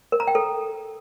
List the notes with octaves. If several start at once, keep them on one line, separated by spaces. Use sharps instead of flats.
A#4
A#5
G5
A4